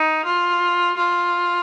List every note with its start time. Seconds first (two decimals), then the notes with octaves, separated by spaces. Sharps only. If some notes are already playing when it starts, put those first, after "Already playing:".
Already playing: D#4
0.25 F4
0.97 F4